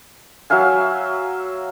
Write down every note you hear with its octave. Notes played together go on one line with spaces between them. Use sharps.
F#3 E5 F5 G#5